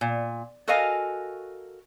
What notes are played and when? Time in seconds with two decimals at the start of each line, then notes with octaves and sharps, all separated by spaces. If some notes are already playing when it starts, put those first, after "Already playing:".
0.01 A#2
0.68 F#4 A4 A#4 D#5 F5 G#5